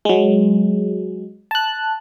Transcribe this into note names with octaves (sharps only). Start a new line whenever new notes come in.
F#3 G#3
A5 F#6